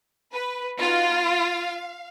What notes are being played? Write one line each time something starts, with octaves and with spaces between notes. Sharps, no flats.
B4
B3 D#4 F4 F#4 F5